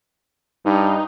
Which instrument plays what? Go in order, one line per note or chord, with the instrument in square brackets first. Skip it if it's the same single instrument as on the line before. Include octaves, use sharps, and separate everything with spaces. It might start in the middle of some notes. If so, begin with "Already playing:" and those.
[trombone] G2 [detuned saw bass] D#4